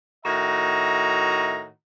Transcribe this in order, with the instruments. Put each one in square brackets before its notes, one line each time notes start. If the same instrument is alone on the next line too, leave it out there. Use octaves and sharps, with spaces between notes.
[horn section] A2 D#3 F#4 E5 A#5